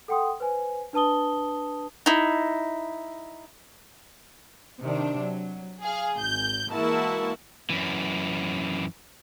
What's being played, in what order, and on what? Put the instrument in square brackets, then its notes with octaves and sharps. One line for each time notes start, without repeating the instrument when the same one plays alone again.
[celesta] A4 F#5 G5 C6 D#6
B4 C5 G#5
D4 B4 A5 D#6 G7
[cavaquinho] D#4 E4
[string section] C3 D#3 D4
F#3
G#4 F5
G#1 G6
E3 G#3 A#3 E4 F#4 A5
[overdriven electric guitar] F#2 E3